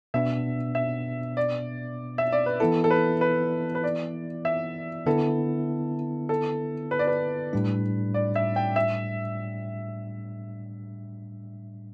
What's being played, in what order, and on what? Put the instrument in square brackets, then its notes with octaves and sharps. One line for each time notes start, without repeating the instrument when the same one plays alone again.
[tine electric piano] B2 B3 D4 [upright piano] E5
[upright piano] E5
D5
E5
D5
B4
[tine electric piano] E3 B3 E4 [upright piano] A4
[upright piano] A4
B4
B4
B4
D5
E5
[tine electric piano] D3 B3 E4 [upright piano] A4
[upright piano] A4
B4
D5
B4
[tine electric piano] A2 G3 D4
[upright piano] D5
E5
G5
E5